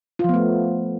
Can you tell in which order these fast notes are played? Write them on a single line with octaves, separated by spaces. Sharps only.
F4 F3 B3 A3